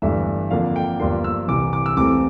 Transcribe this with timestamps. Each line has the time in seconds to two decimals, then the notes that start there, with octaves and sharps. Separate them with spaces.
0.02 G1 G2 E3 A3 D4 E5
0.50 F2 D3 F3 A#3 D4 F5
0.76 G5
1.00 G1 G2 F3 A#3 D4 C6
1.24 E6
1.48 C2 C3 E3 D6
1.73 D6
1.86 E6
1.97 C2 C3 E3 A3 C4 D6